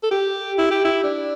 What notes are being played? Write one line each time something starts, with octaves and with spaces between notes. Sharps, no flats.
A4
G4
E4
G4
E4
D4